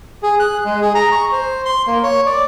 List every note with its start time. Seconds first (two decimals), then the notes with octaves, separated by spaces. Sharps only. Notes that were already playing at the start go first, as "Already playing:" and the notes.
0.23 G#4
0.40 F#6
0.65 G#3
0.82 G#4
0.95 A#5
1.12 C#6
1.32 C5
1.65 C6
1.87 A#3
2.03 C#5
2.26 D5